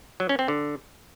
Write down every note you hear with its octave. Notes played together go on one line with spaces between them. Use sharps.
F#3
C#4
C4
D3